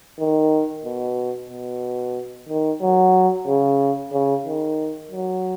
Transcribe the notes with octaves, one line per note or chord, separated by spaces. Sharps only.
D#3
B2
B2
D#3
F#3
C#3
C#3
D#3
F#3